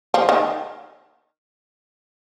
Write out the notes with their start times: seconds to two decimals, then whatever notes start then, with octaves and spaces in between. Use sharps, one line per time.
0.14 F3
0.29 D#3